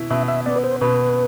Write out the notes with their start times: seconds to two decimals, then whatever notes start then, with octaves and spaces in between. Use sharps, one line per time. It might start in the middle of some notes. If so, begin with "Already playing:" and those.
Already playing: B2 E4
0.10 B2 E5
0.28 E5
0.46 B3 D5
0.56 B4
0.64 C5
0.81 B2 B4